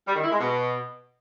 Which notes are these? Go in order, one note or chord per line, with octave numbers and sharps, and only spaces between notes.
G3
D#3
E4
G#3
B2